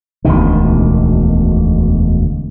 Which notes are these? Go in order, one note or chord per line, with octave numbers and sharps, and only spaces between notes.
E1 D2 B2 D#3